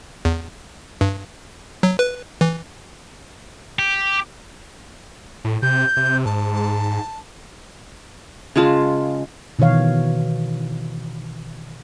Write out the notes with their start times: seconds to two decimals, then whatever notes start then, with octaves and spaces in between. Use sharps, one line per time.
0.25 E2
1.01 G2
1.83 F#3
1.99 B4
2.41 E3
3.79 G4
5.45 A2
5.62 C3 G6
5.97 C3
6.26 G#2 A5
8.56 C#3 G#3 F4 A5
9.59 B2 D#3 E3 C#5 F5